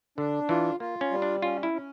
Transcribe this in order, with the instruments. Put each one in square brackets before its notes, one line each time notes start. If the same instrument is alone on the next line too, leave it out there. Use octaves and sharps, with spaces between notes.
[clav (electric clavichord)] D3 [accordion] D4
[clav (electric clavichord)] E3 [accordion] F4
[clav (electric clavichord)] A#3 [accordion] F4
[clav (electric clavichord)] C#4
[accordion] G3
[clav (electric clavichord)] D4
[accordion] C#4 [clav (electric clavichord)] F4
[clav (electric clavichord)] E4
[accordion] C#4